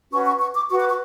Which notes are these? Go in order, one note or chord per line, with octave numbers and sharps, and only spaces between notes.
C#4 F#4 B4 C#6
C#6
C#6
D6
F#4 B4 C#6
D6
C#6